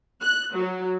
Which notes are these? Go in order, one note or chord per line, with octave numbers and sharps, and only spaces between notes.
F#6
F#3